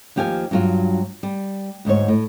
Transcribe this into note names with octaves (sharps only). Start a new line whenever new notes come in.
D#2 F3 G4 F5 G5 G#5
G2 F#3 F4
G3
D2 G#2 C5 C#5
A2